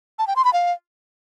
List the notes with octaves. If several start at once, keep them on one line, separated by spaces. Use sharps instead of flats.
A5
G5
C6
B5
F5